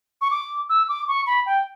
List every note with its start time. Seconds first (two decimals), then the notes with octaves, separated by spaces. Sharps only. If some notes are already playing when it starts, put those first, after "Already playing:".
0.21 C#6
0.31 D6
0.69 E6
0.88 D6
1.08 C#6
1.26 B5
1.46 G5